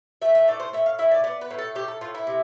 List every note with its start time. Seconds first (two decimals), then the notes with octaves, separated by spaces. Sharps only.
0.22 A3 E5
0.35 E5
0.48 A2 D5
0.60 C5
0.73 A2 E5
0.86 F5
0.99 E4 E5
1.11 D5
1.24 B3 D5
1.41 B4
1.51 A2
1.58 A4
1.75 A2 G4
1.88 A4
2.01 A2 F4
2.14 E4
2.27 C3